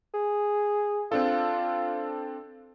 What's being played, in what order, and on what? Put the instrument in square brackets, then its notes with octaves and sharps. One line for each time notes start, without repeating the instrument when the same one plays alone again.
[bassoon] G#4
[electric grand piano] C4 D4 A4 [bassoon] F4